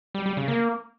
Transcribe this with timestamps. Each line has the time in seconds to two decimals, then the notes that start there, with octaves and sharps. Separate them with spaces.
0.15 G3
0.26 G3
0.37 C#3
0.48 A#3